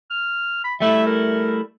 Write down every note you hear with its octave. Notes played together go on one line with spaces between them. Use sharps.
F6
B5
G3 A3 E4 E5
A#4